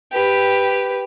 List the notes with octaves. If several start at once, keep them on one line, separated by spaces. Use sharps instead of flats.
G4 B4